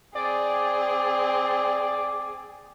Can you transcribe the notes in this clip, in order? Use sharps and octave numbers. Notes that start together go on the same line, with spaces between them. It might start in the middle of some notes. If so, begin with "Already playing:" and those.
C4 G#4 D5